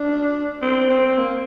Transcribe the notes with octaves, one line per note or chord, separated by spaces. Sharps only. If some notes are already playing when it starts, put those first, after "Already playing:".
Already playing: D4
C4
C4
A#3